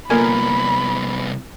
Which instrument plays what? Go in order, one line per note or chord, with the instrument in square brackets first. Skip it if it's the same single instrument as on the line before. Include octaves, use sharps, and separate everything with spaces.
[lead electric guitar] C2 B3 [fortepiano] A#2 A#4 G#5 [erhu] B5